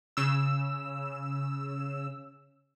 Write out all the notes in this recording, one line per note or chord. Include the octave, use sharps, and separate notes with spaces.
C#3 E6